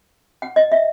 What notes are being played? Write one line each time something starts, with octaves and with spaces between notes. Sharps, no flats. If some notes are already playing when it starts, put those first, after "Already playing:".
F#5
D#5
E5